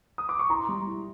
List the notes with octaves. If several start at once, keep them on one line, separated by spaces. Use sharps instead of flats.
D#6
D6
C#6
E4 A#5 C6
G3
E4